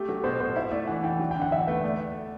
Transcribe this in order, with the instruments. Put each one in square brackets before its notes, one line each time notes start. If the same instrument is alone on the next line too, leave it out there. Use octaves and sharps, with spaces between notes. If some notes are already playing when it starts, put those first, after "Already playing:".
Already playing: [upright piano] A3 [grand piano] G4
[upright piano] F#3 [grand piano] A4
[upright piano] B2 [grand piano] C5
[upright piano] B2 [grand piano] C5
[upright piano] E4 [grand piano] E5
[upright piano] A3 [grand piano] D5
[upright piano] E3 [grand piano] F#5
[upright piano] E3 [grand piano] G5
[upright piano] F#3
[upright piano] D3 [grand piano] G5
[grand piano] F#5
[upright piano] E2 [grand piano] E5
[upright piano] A3 [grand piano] B4
[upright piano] A3 [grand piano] D5